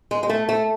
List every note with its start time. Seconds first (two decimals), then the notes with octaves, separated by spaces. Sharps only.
0.11 G#3
0.23 G#3
0.30 A3
0.49 A3